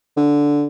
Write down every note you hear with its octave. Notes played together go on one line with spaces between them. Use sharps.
D3